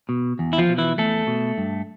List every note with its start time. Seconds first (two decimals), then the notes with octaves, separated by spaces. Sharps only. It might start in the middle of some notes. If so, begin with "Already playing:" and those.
0.09 B2
0.39 E2
0.53 E4
0.58 F3 F4
0.69 B2
0.78 E3 E4
0.98 E2 A3 A4
1.27 B2
1.58 G2